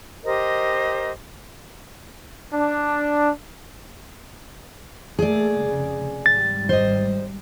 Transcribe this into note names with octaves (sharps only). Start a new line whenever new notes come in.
G4 A#4 C5 D#5
D4
A3 A#3 G#4 D5
F1 C#3
G#1 G3 A6
C5 D#5